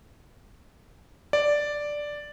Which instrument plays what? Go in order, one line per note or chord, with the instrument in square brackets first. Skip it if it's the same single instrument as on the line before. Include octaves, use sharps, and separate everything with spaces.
[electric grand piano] D5